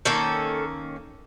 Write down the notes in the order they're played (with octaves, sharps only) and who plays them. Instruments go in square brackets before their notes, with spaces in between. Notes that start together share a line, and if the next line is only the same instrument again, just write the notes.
[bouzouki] D#3 A#3 C#4 A4